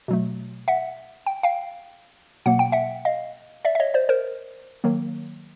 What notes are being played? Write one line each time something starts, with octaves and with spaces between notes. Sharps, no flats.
B2 F#3 A3
E5 F#5
G5
F5 G5
B2 F#3 A#3 F#5
G5
E5 F#5
D#5 F5
D5 E5
E5
C#5 D#5
C5 D5
A#4 C5
D#3 F#3 A#3